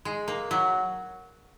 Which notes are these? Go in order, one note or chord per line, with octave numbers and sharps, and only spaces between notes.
G#3
A#3
F#3